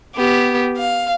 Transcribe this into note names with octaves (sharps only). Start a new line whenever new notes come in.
B3 G4
F5